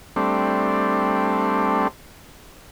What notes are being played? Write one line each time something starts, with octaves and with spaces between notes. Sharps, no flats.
G3 A3 C4 D4